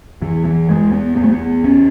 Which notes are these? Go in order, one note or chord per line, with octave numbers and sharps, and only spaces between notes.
E2 E3
E3
E2 G#3
B3
E2 B3
A3
B3
E2 C#4